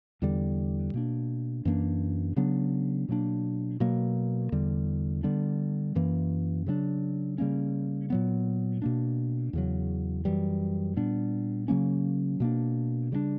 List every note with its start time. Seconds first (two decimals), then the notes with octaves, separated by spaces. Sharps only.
0.22 E2 D3 G3
0.94 B2 A#3 D4
1.65 F#2 E3 A#3 D4
2.36 C#3 F#3 B3 D4
3.09 B2 F#3 A#3 D4
3.80 B2 F#3 A#3
4.52 E2 D3 G3
5.23 D3 G3 B3 D4
5.95 F#2 E3 A#3
6.67 C#3 F#3 B3 D4
7.38 C#3 G3 A#3 C#4
8.10 A#2 F#3 B3
8.82 B2 A#3 D4
9.53 E2 C#3 F#3
10.25 F#2 E3 G3
10.96 A#2 G3 B3 D4
11.68 C#3 F#3 A#3 C#4
12.40 B2 A#3 D4
13.12 C#3 G3 B3 D4